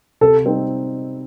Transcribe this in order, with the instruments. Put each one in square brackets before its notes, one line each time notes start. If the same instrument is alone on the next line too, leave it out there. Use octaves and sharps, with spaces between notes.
[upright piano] C3 [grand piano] A4
[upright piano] G3 C4 D#4